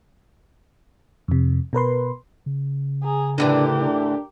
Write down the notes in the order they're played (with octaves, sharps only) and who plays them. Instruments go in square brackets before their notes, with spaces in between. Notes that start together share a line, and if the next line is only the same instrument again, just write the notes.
[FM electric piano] F2 C3
B2 A#4 B4 C6
[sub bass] C#3
[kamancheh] G#4 A#5
[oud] A2 D3 E3 [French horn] D4 [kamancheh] G4 A#4
[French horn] D4